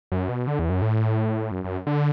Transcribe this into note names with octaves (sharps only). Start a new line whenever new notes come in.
F#2
B2
D3
E2
F#2
A2
F#2
F#2
D3